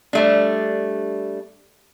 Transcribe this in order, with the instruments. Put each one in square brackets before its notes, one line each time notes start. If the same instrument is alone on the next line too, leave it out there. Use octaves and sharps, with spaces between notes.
[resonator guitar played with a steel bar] G3 A3 D4